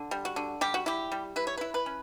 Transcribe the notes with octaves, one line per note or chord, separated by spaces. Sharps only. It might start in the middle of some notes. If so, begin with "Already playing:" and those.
Already playing: D3
G3
F#4
D3
G3 G4
F#4
E4 G4
G3
E4 B4
C#5
E4 B4
B4
C#4